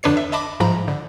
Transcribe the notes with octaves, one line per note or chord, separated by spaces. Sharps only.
F2 D3 D4 B4 C#5 C7
E5
D#5 E5 A5 B5 D6
G#2 F3 A#5 B5
D3